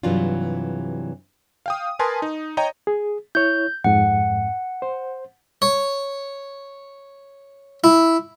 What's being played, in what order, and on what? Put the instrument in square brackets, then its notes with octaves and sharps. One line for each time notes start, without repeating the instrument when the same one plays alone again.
[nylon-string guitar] G2 C3 E3 F#3 D4 F4
[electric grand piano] F5 G5 D#6
A#4 B4 G#5 A5 C6
D#4
C#5 D#5 G5 A#5
[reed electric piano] G#4
[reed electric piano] E4 C#5 [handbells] G6
[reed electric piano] F2 G#2 [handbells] F#5
[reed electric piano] C5
[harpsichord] C#5
E4